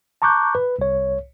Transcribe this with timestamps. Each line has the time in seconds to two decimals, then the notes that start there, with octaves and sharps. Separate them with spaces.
0.22 A5 A#5 C#6 D6 F#6 G6
0.55 B4
0.79 C2 C#5